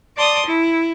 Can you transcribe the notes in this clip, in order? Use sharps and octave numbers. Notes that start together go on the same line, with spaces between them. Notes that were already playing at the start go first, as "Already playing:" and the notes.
D5 A5 C6 D#6
E4